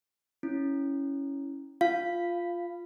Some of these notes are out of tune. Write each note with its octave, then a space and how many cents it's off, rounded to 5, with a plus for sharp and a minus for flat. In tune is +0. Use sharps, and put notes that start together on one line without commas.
C#4 +0 E4 -10
F4 +0 F5 -15